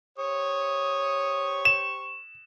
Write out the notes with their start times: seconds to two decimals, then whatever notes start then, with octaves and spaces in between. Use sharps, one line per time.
0.18 G4 C5 C#5 C#6 D#6
1.65 E7